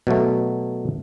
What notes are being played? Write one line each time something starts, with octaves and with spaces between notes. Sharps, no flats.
B2 F#3 A3